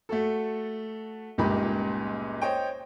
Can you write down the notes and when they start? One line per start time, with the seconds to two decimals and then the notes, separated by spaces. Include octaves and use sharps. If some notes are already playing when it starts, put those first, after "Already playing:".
0.09 A3 F#4 A4
1.38 G1 C#2 A#2 D#4 G4 B5
2.41 C5 C#5 D#5 G5